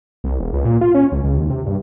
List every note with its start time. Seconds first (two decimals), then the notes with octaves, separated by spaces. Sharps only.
0.24 C2
0.39 E1
0.53 C#2
0.65 A#2
0.81 F4
0.95 C#4
1.12 C#2
1.24 C#2
1.38 D#2
1.50 C3
1.66 G2